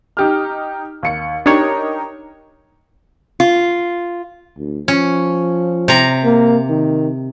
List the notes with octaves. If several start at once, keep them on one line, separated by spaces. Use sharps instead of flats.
D#4 G4 F6
D#2 C#7
D4 D#4 G4 A#4 C#5
F4
D2
F3 C#4
C3 A#5
A#3
D#3